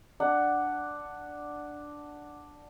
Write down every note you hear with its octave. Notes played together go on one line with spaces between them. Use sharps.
D4 F#5